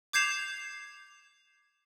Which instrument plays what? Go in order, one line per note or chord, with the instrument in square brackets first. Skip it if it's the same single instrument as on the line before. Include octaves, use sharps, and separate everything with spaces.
[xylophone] D6 G6 G#6 C7 E7 F7